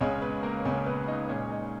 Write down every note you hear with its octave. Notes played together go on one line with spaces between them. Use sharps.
C#2 C#3 G#3 C#4 C#5
B3 B4
A#3 A#4
C#2 C#3 G#3 C#4 C#5
B3 B4
D#4 D#5
A#2 G#3 C#4 C#5
D#4 D#5